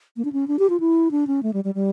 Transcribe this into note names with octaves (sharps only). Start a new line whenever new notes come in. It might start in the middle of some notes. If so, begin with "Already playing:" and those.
A#3
D4
C#4
D4
G4
F4
E4
D4
C#4
A3
G3
G3
G3